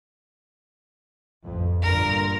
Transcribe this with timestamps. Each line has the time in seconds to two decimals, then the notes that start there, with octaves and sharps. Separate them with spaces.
1.44 A1 F2
1.83 G2 A#2 D3 A#4